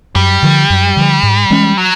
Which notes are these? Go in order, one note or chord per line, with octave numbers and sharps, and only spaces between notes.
F#2 G3
D3 F3
F#2
D3 F3
G#2
E3 G#3 C#4
F#3